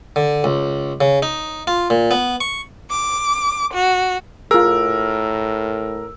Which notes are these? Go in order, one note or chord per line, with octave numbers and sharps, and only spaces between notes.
D3
C#2
C#3
D#4
F4
A#2
B3
C#6
D6
F#4
A2 F4 G#4 A#4 E6